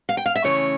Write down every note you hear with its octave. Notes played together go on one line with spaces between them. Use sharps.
F5
G5
F5
E5
C#3 E3 A3 C#4 C#5